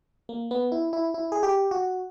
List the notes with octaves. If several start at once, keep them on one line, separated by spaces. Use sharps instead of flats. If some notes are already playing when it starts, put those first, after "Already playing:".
A#3
B3
E4
E4
E4
G#4
G4
F#4